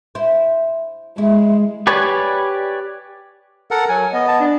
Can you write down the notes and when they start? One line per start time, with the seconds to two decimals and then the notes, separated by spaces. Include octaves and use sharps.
0.15 E4 C5
1.18 G#3 E4
1.87 G4 B4 C#5 D5 G#5
3.71 A4 A#4 F#5
3.89 F#3 G#5
4.13 B3 D#5
4.28 A5
4.40 D4